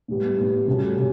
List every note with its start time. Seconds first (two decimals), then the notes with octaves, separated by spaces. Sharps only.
0.08 A2 G3 B3
0.38 A2 G3 B3
0.67 C#3 G3 C#4 F#4 A4
0.97 C#3 G3 C#4